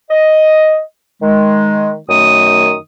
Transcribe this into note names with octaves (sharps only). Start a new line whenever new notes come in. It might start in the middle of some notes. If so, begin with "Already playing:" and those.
D#5
D#3 G#3
F#2 D#3 A3 D#6